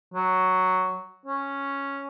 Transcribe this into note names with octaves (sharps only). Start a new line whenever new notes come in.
F#3
C#4